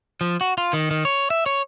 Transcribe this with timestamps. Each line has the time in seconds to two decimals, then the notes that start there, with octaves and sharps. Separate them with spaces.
0.21 F3
0.41 F#4
0.58 F4
0.73 D#3
0.91 D#3
1.05 C#5
1.30 E5
1.46 C#5